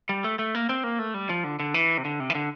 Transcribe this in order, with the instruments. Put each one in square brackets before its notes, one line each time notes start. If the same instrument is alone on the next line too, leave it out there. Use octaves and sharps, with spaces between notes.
[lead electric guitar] G3
A3
A3
A#3
C4
A#3
A3
G3
F3
D3
D3
E3
C3
D3
C3
E3
D3